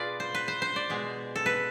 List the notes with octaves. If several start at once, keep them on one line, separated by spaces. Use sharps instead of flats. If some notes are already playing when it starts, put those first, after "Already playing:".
Already playing: B2 F4 G#4 B4 D5
C5
B4
C5
C5
D5
B2 G#3
A4
B4